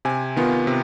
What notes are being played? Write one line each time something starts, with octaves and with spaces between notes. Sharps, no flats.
C3 G#5
D#3 B3 F4
C3